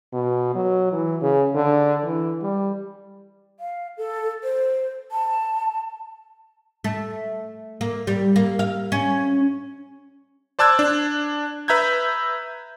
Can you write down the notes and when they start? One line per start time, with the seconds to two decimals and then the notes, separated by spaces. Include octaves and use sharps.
0.13 B2
0.55 F#3
0.92 E3
1.21 C#3
1.55 D3
2.05 E3
2.42 G3
3.60 F5
3.97 A4
4.43 C5
5.12 A5
6.84 A3
7.81 A#3
8.07 G3
8.36 A#3
8.59 F5
8.92 C#4
10.59 C5 D5 A5 E6 F#6 G#6
10.79 D4
11.68 B4 E5 A#5 G6 G#6